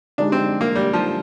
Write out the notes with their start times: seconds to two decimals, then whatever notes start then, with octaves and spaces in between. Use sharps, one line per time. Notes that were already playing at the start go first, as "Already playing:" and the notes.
0.18 D3 G#3 D4 D#4 G4
0.32 C4
0.61 A#3
0.75 G3
0.93 F3